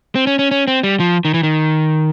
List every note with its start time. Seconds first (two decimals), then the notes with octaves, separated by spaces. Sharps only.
0.15 C4
0.27 C#4
0.39 C#4
0.51 C#4
0.67 C4
0.83 G3
1.00 F3
1.25 D#3
1.34 E3
1.43 D#3